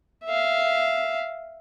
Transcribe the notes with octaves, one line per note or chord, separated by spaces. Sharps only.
E5 F5